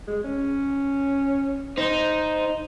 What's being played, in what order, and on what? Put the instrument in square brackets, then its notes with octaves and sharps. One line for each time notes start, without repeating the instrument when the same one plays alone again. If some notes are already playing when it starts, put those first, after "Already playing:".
[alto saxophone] G#3
C#4
[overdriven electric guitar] D#4 [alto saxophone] C5